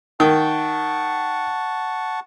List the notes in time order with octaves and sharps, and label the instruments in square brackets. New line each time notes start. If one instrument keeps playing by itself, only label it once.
[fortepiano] D#3 [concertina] F#5 A5 C#6